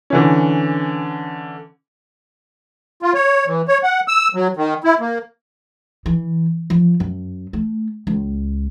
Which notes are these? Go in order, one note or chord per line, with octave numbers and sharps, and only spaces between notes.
D3 E3 C#4
F4
C#5
E3
C#5
F#5
E6
F#3
D#3
E4
A#3
E3
F3
F#2
A3
C#2